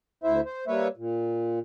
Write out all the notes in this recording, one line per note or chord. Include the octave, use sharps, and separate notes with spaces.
D2 E4 C5 E5
C5
G3 A#3 B4 C#5 E5
A#2